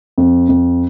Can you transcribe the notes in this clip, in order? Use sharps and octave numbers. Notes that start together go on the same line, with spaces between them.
F2
F2